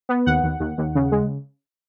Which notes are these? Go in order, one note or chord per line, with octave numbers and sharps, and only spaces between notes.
B3
D#2 F#5
D#2
D#2
D#2
C#3
G#3